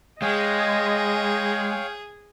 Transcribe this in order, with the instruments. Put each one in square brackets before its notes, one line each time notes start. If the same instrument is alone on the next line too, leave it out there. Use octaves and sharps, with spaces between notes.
[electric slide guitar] G#3 [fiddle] G#4 [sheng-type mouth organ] C#5 F5 G5 [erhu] D#5